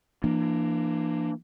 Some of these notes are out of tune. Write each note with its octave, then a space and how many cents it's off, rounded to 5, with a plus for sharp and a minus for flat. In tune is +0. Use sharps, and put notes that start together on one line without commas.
E3 +40 A#3 +0 D4 +30